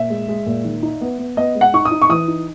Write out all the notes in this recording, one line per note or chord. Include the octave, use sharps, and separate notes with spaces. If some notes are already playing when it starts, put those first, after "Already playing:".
Already playing: A#2 E5
G#3
G#3
A#2
D#3
D#4
B3
B3
B3 D#5
G#3
F#5
D#4 C#6
D#6
D#4
C#6
E3 D#6
D#4